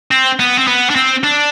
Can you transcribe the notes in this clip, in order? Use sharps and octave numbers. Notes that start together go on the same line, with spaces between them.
C4
B3
C4
B3
D4
C4
D4